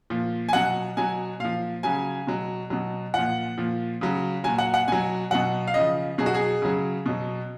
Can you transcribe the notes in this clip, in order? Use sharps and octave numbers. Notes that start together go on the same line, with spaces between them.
A#2 F3
G#5
B2 F#3 F#5
B2 F#3 G#5
A#2 F3 F5
C#3 F#3 G#5
B2 F#3
B2 F#3
A#2 F3 F#5
A#2 F3
C#3 F#3
A#2 F#3 G#5
F#5
F#5
B2 F#3 G#5
B2 F#3 F#5
F5
C#3 F3 D#5
B2 F#3 G#4
F#4
G#4
C#3 F#3
B2 F#3